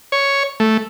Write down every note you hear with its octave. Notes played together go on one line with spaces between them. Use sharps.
C#5
A3